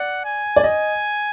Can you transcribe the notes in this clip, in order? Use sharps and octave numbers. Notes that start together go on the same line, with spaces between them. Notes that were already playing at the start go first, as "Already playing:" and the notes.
Already playing: D5 F#5
G#5
D5
D#5 G#5